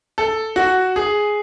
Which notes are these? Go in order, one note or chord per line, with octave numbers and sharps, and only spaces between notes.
A4
F#4
G#4